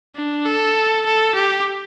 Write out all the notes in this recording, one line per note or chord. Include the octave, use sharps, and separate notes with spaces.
D4
A4
A4
G4